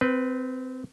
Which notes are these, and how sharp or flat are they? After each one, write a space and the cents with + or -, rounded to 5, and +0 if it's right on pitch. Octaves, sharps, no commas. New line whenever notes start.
C4 -20 B4 +0